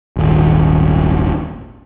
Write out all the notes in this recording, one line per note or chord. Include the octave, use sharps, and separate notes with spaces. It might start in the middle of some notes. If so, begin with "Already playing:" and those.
D#1 G#1